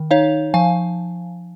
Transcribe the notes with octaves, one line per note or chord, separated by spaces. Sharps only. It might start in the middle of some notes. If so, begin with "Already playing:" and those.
Already playing: D#3
D#4 C#5 F5
F3 F5 G#5